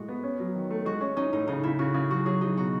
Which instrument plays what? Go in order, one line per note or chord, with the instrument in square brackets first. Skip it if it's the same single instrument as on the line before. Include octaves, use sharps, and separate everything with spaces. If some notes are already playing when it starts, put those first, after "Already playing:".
Already playing: [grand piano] A2 G#3 [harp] F#4
[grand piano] B3
C#4
F#3
D#3
A3
[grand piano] G#3 [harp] F#4
[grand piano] C#4 [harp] F#4
[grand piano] C#4 [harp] D#4
[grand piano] A2 [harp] D#4
[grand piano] C#3 [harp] D#4
[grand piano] C#3 [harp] E4
[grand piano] C#3 [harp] F#4
[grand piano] C#3 [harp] G#4
[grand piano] F#3 [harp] F#4
[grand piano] F#3 [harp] G#4
[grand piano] F#3 [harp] D#4
[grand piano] B2 [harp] F#4